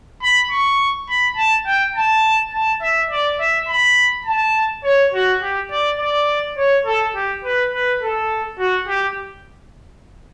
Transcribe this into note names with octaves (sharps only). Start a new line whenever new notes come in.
B5
C#6
B5
A5
G5
A5
A5
E5
D5
E5
B5
A5
C#5
F#4
G4
D5
D5
C#5
A4
G4
B4
B4
A4
F#4
G4